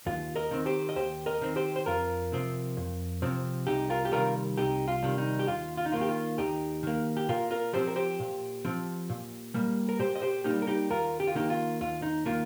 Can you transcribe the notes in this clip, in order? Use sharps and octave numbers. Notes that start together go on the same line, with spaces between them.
D#2 F4
A#4 D#5
D#3 C4
G4 C5
D#5
D#2 G4 C5
A#4 D#5
D#3 C4
G4 C5
C5
F2 F4 A#4
C3 F3 C4
F2
C3 F3 C4
C2 D#4 G4
F4 A#4
G4
C3 D#3 G3 F4 A#4
C2 D#4 G4
F4
C3 D#3 G3
D#4
G4
D#2 F4
F4
D#4
D#3 A#3 F4
G4
F4
D#2 D#4 G4
D#3 A#3
G4
A#2 F4 A#4
F4 A#4
F3 C4 G4 C5
A#4
G4 C5
A#2
F3 C4
A#2
G3 A#3
A#4
A#2 G4 C5
D#5
G4 C5
G3 A#3 D#4 G4
A#4
D#4 G4
D#2 F4 A#4
G4
F4
D#3 A#3 D#4 G4
F4
D#2 F4
D#4
D#3 A#3 F4